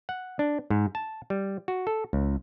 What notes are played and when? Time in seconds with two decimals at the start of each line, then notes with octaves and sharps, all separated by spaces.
0.09 F#5
0.39 D4
0.70 G#2
0.95 A5
1.30 G3
1.68 F#4
1.87 A4
2.13 C#2